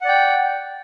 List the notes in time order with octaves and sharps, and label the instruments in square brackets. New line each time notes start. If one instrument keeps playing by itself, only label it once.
[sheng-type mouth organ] F#5
D5
G5